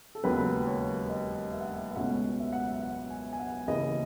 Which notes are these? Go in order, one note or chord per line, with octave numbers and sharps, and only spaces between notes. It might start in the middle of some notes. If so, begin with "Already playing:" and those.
A4
E1 D#2 C#3 F#3 B4
C#5
D#5
E5
F#5
E5
E5
C#2 B2 A3 C#4 F#5
E5
F#5
E5
F#5
G#5
G#5
F#5
D#2 C#3 E3 D#5